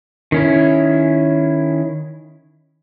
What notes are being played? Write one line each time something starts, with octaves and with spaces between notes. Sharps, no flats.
D#3 C#4 E4